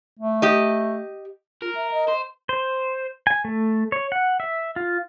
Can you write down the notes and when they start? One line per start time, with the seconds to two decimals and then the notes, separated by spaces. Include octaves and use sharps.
0.19 A3
0.42 G4 D#5
1.62 F4 A#4
1.75 E5
1.92 D#5
2.08 C5
2.49 C5
3.27 G#5
3.45 A3
3.92 C#5
4.12 F#5
4.40 E5
4.76 F4